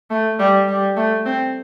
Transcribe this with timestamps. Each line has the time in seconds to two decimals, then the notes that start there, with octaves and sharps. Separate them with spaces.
0.10 A3
0.39 G3
0.68 G3
0.96 A3
1.25 C4